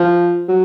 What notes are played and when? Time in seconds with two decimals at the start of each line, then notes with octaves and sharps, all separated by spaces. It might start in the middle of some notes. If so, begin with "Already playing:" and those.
Already playing: F3
0.48 F#3